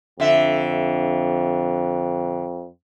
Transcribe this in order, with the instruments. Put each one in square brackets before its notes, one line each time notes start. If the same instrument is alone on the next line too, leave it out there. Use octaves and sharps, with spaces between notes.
[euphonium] F2 [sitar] D3 E5